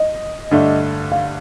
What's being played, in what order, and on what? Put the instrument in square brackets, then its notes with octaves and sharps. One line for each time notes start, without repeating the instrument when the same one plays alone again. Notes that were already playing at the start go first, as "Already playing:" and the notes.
Already playing: [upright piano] D#5
[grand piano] G2 D3 A3 D4
[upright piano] F5